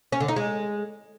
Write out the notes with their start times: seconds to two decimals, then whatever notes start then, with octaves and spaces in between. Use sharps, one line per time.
0.12 C#4
0.20 D3
0.28 D#4
0.36 G#3